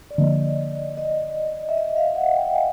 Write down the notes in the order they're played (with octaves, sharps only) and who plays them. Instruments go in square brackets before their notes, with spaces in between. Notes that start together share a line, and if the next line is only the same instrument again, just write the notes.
[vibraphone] D5
[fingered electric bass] D3 F3 A#3 [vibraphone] D#5
[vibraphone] D#5
E5
D#5
F5
F#5
G5
G#5